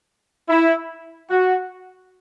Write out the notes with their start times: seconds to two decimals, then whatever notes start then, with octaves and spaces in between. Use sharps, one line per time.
0.49 E4
1.30 F#4